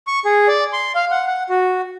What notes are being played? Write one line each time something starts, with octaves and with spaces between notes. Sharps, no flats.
C#6
G#4
D5
C6
F5
F#5
F#5
F#4